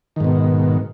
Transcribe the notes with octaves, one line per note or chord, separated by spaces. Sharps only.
G#2 B2 D#3